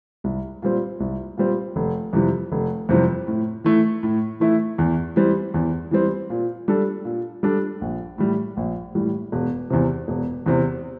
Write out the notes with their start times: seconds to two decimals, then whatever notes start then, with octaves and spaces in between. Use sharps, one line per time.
0.24 C2
0.62 A#2 G3 C4
1.00 C2
1.37 A#2 G3 C4
1.76 F1
2.13 F2 C3 E3 G3
2.52 F1
2.89 F2 C3 E3 G3
3.27 A2
3.64 E3 A3 E4
4.03 A2
4.40 E3 A3 E4
4.78 E2
5.16 E3 G3 C4
5.54 E2
5.91 E3 G3 C4
6.30 A#2
6.68 G3 D4 A4
7.05 A#2
7.43 G3 D4 A4
7.81 A#1
8.18 A2 E3 G3
8.57 A#1
8.95 A2 E3 G3
9.32 E1
9.70 E2 C3
10.08 E1
10.46 E2 C3